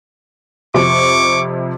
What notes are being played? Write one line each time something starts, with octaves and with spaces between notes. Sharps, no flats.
F2 C3 C#6 D6